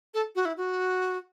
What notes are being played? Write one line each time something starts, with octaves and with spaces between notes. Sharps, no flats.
A4
F#4
E4
F#4